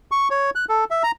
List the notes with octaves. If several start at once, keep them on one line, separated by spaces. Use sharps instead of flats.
C#6
C#5
F#6
A4
E5
A#5